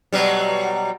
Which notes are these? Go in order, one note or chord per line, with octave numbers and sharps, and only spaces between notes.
B2 F#3 G3